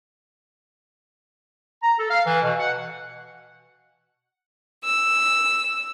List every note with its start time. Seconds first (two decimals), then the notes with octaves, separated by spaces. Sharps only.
1.83 A#5
1.98 A4
2.10 F5
2.26 E3
2.42 B2
2.59 F#5
4.84 E6